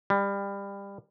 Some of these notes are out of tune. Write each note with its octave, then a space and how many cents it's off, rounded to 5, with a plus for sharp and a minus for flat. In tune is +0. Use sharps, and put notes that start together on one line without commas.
G3 +25